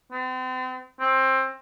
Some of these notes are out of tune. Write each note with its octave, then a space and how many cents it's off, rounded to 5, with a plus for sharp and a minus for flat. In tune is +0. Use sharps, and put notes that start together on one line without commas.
C4 -40
C4 +20